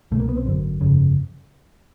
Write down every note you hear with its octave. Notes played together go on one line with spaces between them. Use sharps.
C2 B2 A3
A#3
B3
C4
G#1 F#2 D3
G1 F2 C#3